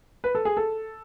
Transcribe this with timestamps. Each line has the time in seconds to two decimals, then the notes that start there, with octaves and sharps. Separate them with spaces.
0.24 B4
0.35 A4
0.45 G#4
0.57 A4